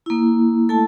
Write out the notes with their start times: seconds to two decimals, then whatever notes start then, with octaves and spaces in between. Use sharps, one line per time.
0.06 A#3 E4
0.69 A3 E4 A4 A5